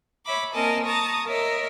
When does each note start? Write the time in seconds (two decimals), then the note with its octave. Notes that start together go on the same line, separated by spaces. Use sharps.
0.25 C#5 E5 B5 D6
0.54 A#3 C4 A#4 D#5 G#5 A5
0.83 A5 A#5 C#6 D#6
1.27 A#4 C#5 D#5 E5